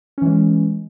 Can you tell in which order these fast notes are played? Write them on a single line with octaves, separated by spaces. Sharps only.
C#4 E3 G#3